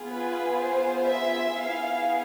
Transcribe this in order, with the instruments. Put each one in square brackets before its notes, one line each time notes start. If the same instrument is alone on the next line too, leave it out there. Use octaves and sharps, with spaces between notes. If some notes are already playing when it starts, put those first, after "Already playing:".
Already playing: [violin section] B3 F4 G#4
B4
C5
E5
B3 E4 G#4 F5